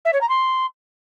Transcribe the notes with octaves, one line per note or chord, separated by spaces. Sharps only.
E5
C#5
A#5
C6